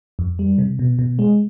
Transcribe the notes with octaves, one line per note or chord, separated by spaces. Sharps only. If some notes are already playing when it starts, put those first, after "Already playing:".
F2
G3
C3
B2
B2
G#3